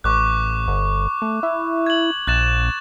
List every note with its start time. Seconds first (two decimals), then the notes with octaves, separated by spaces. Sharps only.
0.04 A1 C#6 D6 F#6
0.68 G1
1.22 A3
1.43 E4
1.86 G#6 F#7
2.27 A#1 F#6 A6 E7